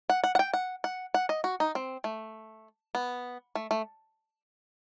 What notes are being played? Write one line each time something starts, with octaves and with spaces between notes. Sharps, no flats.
F#5
F#5
F#5
G5
F#5
F#5
F#5
D#5
F#4
D#4
C4
A3
B3
A3
A3